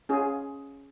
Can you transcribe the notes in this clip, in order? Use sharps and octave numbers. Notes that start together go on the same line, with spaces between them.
C#4 F4 G#4